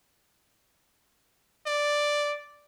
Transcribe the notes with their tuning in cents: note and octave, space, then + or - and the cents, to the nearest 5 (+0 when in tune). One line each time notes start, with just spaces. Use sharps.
D5 +0